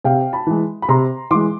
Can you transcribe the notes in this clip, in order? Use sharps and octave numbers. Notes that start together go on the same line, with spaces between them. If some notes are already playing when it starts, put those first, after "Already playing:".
C3 F5 G5
A5 B5
E3 G#3
B5
C3 A#5 C6
E3 G#3 C6 D6